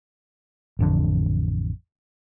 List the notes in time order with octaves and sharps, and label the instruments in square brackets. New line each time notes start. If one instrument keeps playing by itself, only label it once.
[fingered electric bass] A1 F2 D3